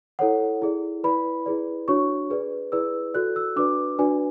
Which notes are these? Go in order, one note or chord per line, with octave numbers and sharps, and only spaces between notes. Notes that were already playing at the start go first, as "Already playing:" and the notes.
E4 A4 C#5 F#5
E4 G#4 D5
E4 B4 D5 B5
E4 G#4 B4 D5
D4 F#4 C#5 C#6
G#4 B4 D5
E4 G#4 B4 D5 E6
F#4 A4 D5 F#6
E6
D4 F#4 B4 D5 D6
D4 F#4 B4 D5 G#5